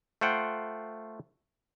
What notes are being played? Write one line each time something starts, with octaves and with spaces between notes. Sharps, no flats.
A3 F4 C5 F#5 G5